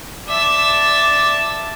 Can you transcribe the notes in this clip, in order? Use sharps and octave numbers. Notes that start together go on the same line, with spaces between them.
D5 E5 A5